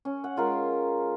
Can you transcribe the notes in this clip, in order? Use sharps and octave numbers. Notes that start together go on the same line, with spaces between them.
C#4
F#5
G#3 F4 A#4